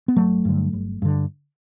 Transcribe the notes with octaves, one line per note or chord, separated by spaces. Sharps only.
B3
G1 F#3 A3
G2 D3
G1
G2 D3